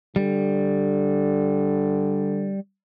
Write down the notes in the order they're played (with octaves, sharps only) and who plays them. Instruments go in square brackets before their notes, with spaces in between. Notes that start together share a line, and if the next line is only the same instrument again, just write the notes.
[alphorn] D3 [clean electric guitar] G3